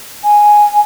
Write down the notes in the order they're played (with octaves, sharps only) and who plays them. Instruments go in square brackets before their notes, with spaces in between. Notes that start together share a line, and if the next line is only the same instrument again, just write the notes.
[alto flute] G#5